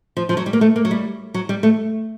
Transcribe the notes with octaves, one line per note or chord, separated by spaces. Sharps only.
F3
F3
F#3
G3
A#3
A3
A#3
F#3
G3
F#3
G3
A3